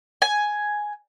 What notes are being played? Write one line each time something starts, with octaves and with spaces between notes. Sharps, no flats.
G#5